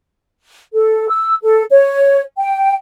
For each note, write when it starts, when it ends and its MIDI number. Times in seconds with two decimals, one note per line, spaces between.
0.74 1.08 69
1.08 1.35 88
1.43 1.63 69
1.71 2.21 73
2.38 2.74 79